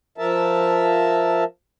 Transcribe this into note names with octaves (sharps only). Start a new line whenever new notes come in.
F3 A#4 E5 A5